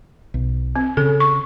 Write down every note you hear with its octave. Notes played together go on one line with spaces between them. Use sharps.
B1
C4
C#3 A4
C#6